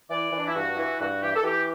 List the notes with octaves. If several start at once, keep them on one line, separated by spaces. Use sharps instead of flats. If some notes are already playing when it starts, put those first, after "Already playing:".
E3 D5
E3
D4
E4
G2 F#4
E3
G2 F#4
E3 G4
A4
E3 G4